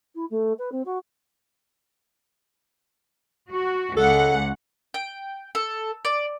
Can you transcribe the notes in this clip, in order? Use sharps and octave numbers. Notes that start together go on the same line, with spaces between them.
E4
A3
B4
C4
F#4
F#4
C#2 A4 F#5
G5
A4
D5